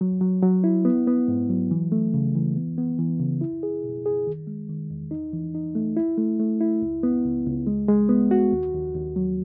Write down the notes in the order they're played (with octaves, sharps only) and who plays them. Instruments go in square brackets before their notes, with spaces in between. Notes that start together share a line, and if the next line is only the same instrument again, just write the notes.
[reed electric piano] F#3
F#3
F#3
E4
B3
B3
G#2
F#3
E3
A3
C#3
E3
B3
B3
E3
C#3
E4
G#4
B2
G#4
D#3
G#3
D#3
E2
D#4
E3
D#4
A3
E4
A3
A3
E4
C#2
B3
C#2
C#2
G#3
G#3
B3
F#4
D#2
D#2
D#2
F#3